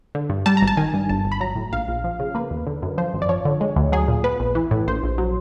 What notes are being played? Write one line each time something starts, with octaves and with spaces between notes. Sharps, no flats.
D3
G2
G3 A5
A#5
G#1
A5
D#3 G#5
G2
G1 A5
G1
B5
F#3 A#5
A2
A#1 F5
A#1
F3
C#3
A#3 B4
D#2
D3
F#2
F3 C5
G#1
D5
F3 C#5
D3
G#3
D2
F#3 G#4
A#2
B3 B4
A#1
E3
A2
A#1 C5
A#1
F#3